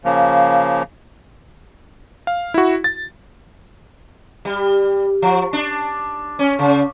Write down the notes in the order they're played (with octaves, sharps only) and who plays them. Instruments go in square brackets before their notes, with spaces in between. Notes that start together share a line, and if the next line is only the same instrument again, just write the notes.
[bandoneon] C#3 F3 A#3
[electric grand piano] F5
E4 F#4
A6
[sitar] G3
F3
D4
C#4
C#3